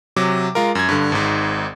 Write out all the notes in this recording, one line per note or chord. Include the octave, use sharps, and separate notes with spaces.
C3 F#3 D6
G#3 F4 A#4
F#2 G#6
G2 D3
G#1 G#2